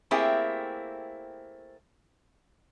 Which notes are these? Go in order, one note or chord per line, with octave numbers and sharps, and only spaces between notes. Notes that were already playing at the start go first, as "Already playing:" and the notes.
A3 A#3 C4 E4 G4 G#4